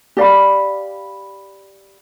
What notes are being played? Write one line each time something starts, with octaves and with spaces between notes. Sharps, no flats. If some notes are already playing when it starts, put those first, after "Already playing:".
G4 D5 F5 B5